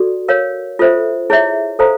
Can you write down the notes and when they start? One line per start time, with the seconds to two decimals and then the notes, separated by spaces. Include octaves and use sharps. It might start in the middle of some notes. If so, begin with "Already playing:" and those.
Already playing: F#4 A4 D5
0.28 A#4 C#5 F5
0.79 F4 A4 C5 E5
1.30 E4 G#4 C#5 E5
1.79 A4 C5 F5 A#5